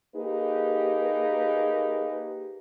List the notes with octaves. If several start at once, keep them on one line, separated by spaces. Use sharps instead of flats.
A#3 D#4 G4 G#4 A#4 B4